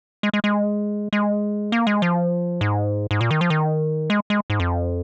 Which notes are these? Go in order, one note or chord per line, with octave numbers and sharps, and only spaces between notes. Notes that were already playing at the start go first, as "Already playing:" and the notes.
G#3
G#3
G#3
G#3
A#3
G#3
F3
G#2
G#2
A#2
D#3
F3
D#3
G#3
G#3
G#2
F2